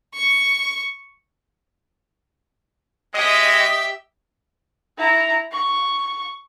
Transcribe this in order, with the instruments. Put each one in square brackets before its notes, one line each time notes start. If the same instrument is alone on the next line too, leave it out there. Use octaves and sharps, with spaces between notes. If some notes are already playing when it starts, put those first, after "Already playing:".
[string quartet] C#6
[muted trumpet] G#3 [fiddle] G4 E5 [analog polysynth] D#5
[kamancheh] E4 A#5
C#6